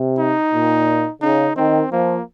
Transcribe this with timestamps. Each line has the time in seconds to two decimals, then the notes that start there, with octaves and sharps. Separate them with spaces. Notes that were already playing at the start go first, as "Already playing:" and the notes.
Already playing: C3
0.18 D#4
0.53 A#2
1.22 C#3 D#4
1.56 D#3 C4
1.91 F3 A#3